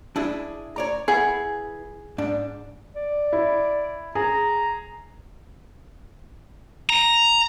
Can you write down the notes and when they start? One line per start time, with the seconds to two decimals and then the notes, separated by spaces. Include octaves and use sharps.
0.16 D4 E4 G#4
0.76 C#5 D5 A#5
1.08 E4 G#4 B4 F#5
2.18 G#2 D4
2.95 D5
3.33 E4
4.15 G#4 A#5
6.90 A#5